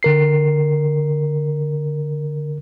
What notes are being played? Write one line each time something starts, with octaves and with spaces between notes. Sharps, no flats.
D3 A#4 C7